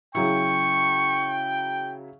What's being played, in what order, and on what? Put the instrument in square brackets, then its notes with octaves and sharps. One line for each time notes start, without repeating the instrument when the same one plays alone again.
[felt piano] C#3 F#3 E4 [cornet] G5 [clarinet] C#6